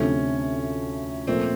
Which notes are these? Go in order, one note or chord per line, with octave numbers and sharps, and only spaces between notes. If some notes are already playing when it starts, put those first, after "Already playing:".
Already playing: D2 C3 F3 A3 C#4 D4
A#2 F3 A3 C4